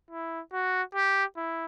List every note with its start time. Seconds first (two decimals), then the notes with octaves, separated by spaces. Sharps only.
0.11 E4
0.53 F#4
0.95 G4
1.37 E4